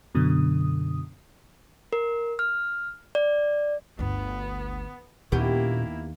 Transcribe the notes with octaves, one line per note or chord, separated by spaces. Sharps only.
F#2 B2 D3 D#6
A#4
F6
D5
G1 D2 B3
D#2 A#2 A#3 B3 C#4 E4 G4